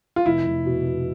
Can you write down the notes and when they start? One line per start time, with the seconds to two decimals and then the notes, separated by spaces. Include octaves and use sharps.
0.16 F4
0.26 F1 E4
0.46 F1
0.66 B2
0.86 B2